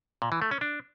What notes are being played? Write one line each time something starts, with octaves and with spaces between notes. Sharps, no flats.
A#2
E3
A3
C#4
D4